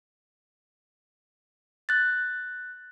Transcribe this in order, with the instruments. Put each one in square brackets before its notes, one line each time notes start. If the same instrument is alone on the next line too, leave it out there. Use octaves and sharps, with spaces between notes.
[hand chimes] F#6 A6